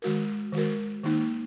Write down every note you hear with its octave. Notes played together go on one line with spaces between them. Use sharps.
D#3 G#3 F#4 A#4
D#3 G#3 F#4 A#4
D#3 A#3 D#4